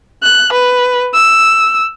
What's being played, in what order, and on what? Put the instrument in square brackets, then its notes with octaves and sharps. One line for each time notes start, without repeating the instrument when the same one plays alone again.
[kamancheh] F#6
B4
E6